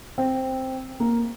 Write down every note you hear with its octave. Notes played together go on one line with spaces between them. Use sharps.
C4
A#3